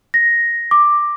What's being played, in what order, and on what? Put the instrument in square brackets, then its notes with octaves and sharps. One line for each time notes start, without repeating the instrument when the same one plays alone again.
[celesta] A#6
D6